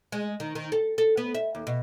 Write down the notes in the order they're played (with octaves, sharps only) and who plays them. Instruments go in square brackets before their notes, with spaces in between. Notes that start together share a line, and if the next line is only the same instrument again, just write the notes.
[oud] G#3
D#3
D#3
A4
A4
B3
E5
D#2
B2